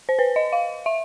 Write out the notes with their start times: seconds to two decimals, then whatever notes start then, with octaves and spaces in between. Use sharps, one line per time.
0.09 C5
0.19 B4
0.36 D#5
0.53 F5
0.86 E5